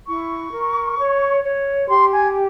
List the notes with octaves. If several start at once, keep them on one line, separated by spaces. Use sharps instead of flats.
E4 C#6
A#4
C#5
C#5
G4 C6
G#5